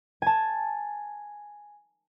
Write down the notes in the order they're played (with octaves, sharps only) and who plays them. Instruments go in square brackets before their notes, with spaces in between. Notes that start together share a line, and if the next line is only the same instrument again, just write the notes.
[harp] G#5 A5